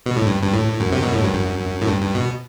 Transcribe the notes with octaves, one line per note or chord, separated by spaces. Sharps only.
B2
A2
G2
G2
A2
F#2
C3
B2
A2
G2
F#2
A2
G2
G2
B2